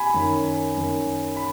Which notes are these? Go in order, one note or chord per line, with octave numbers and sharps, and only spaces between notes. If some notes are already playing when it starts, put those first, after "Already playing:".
Already playing: G#5 B5
F#2 D#3
F#2 D#3
B5